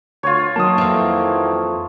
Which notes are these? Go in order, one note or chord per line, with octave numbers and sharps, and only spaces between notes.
D2 F4 C#5
D#3 F#3 A#3 A5 D#6
F2 E3